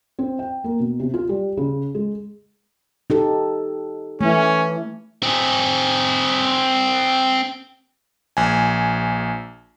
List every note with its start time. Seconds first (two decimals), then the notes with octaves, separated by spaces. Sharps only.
0.19 C4
0.39 G5
0.64 A#3
0.80 B2
1.00 C3
1.14 F4
1.29 G3
1.57 C#3
1.95 G#3
3.10 D#4 G4 A4
4.21 E3 A3 C#4
5.23 C4 G#4
8.37 A#1 G#5